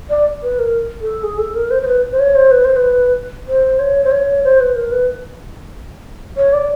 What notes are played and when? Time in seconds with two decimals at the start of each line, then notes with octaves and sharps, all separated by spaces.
0.10 D5
0.43 B4
0.59 A#4
1.01 A4
1.23 G#4
1.38 A4
1.55 A#4
1.71 C5
1.82 C5
1.88 B4
2.12 C5
2.19 C#5
2.35 C5
2.51 B4
2.64 C5
2.76 B4
3.48 C5
3.79 C#5
4.04 C5
4.11 C#5
4.44 C5
4.60 B4
4.76 A#4
4.92 B4
6.37 C#5
6.53 D5